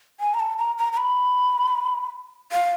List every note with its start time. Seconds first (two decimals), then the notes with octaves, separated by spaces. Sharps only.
0.20 G#5
0.34 A#5
0.40 A5
0.58 A#5
0.78 A#5
0.93 A#5
0.97 B5
2.52 F5